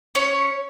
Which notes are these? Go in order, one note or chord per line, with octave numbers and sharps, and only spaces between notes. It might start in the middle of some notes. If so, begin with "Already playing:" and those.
C#4 C#5